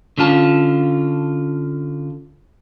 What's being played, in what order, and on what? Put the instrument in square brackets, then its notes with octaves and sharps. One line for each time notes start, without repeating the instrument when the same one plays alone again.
[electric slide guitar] D3 C#4 F4 A5